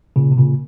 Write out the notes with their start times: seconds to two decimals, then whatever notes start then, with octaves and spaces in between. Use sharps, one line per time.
0.16 A#2 C#3
0.32 C3
0.37 A#2 C#3